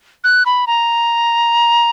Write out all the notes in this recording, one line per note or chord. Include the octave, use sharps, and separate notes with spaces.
F#6
B5
A#5